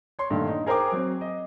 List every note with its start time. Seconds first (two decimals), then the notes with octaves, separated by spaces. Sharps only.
0.19 C#5 C6
0.30 G2 A#2 D3 D#3 A3
0.48 D#4
0.66 G#4 A#4 C5 G5 G#5 D6
0.92 F#3 C4
1.21 D#5